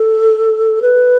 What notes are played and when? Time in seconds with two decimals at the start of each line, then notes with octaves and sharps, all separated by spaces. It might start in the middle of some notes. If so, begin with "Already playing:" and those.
Already playing: A4
0.82 B4